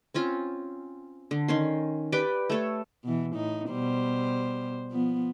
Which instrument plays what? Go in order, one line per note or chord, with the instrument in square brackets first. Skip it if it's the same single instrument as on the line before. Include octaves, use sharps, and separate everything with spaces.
[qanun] C4 C#4 F4
D3
D#3 C#4 C6
G4 B4 D5 G5
A3 A4 C#5
[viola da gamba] B2 E3
A2 D#4
B2 G3 C5
F3 B3